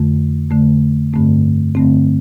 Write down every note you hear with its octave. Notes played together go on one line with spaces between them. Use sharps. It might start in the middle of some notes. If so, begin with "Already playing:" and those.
Already playing: F2 D3 A3
F2 D3 A3
G2 D3 A3 C4
G2 D3 A3 C4